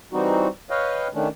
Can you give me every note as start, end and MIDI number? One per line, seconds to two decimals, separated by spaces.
0.13 0.48 52
0.13 0.48 55
0.13 0.48 60
0.13 0.48 63
0.13 0.48 66
0.70 1.08 71
0.70 1.08 73
0.70 1.08 75
0.70 1.08 77
0.70 1.08 79
1.14 1.28 51
1.14 1.28 57
1.14 1.28 61
1.14 1.28 62